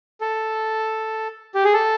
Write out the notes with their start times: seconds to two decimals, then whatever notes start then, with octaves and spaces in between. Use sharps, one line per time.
0.21 A4
1.55 G4
1.64 G#4
1.74 A4